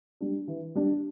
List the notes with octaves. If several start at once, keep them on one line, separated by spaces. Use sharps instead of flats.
G3 D4
E3
G3 D4